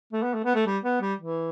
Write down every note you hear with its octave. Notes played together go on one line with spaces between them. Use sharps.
A3
B3
A3
B3
A3
G3
B3
G3
E3